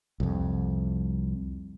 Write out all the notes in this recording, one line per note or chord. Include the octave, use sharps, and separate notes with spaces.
C2 F2